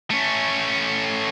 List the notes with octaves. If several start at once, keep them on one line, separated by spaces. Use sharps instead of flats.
A3 C#4